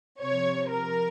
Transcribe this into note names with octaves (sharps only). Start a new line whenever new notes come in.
C3 F3 C#5
A#4